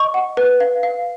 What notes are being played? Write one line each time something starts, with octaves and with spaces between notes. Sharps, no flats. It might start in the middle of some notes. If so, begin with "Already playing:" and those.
Already playing: D#5 C#6
F#5
B4
F5
F5